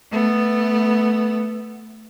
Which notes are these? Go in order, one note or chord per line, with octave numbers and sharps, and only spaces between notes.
A3 B3